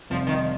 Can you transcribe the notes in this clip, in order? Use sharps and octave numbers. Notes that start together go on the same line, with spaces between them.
F1 F2 C3 F3 G3
D#3